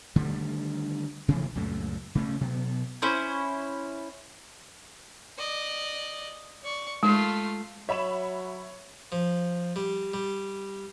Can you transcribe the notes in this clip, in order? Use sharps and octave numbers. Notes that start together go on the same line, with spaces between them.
D3 D#3 G3 A3
C3 E3 F3 A3
C#2 F#2 A#2 A3
C#3 A3 C#4
B2 F#3 B3
C#4 E4 C5
D5 D#5
D5 C#6
G#3 A3 F4
F#3 C#5 E5 B5 E7
F3
G3
G3